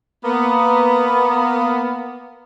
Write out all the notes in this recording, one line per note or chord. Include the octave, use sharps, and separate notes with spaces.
A#3 B3